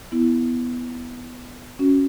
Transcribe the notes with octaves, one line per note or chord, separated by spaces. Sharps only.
B3 E4
C#4 F#4